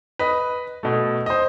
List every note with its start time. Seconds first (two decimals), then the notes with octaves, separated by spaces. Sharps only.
0.19 B4 D#5
0.83 B2 A3
1.26 C5 D#5